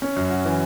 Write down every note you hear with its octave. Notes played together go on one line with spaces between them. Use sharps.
C#4
F#2
F#4
E3